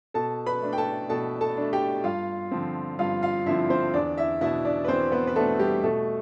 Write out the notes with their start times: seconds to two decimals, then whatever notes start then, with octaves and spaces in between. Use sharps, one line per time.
0.14 B2 A4 A5
0.46 B4 B5
0.62 A3 D4
0.73 G5
0.78 A4 A5
1.09 B2 A4 A5
1.41 A4 A5
1.57 A3 D4
1.73 G4 G5
2.04 G2 F4 F5
2.51 D3 F3 C4
2.99 G2 F4 F5
3.22 F4 F5
3.46 D3 F3 C4 E4 E5
3.70 C4 C5
3.94 E2 D4 D5
4.18 E4 E5
4.41 B2 B3 D4 E4 E5
4.65 D4 D5
4.84 B4
4.88 E2 C4 C5
5.12 B3 B4
5.27 B4
5.36 B2 A3 B3 D4 A4
5.59 G3 G4
5.83 B2 A3 A4